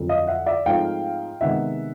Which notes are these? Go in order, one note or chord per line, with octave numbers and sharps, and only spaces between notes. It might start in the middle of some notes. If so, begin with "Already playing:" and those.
Already playing: F2 D3 F#3
D#5 F5
E5 F#5
D5 E5
G#2 F3 A3 C4 F5 G5
C3 D#3 G#3 B3 E5 F#5